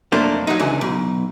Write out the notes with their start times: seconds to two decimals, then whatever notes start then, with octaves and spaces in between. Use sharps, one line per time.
0.12 B1 F2 A3 A#3 D4 C5
0.47 F#3 D#4
0.60 C#2 D3 E3
0.81 B1